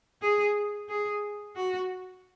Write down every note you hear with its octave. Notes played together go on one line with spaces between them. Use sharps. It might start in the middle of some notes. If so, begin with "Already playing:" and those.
G#4
G#4
F#4